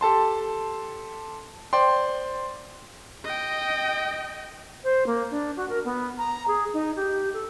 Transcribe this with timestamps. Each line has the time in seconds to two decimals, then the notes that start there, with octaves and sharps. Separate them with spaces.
0.01 G4 A4 A5 C6
1.73 C5 D5 G5 C6
3.24 D#5 G5
4.84 C5
5.07 A#3
5.31 D4
5.57 F#4
5.69 A#4
5.85 B3
6.18 A#5
6.48 G#4
6.74 D#4
6.96 G4
7.34 A4